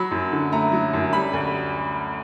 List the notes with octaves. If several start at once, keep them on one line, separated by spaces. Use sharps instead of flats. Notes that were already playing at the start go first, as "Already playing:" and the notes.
Already playing: F#3 B5
F#2
D3
A3 A#5
F#3
F#2
G3 B5
D2